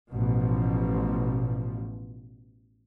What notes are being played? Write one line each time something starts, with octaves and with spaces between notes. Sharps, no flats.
A1 B2 F3